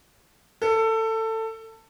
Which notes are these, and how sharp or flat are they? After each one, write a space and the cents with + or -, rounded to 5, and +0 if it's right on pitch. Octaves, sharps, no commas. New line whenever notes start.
A4 +20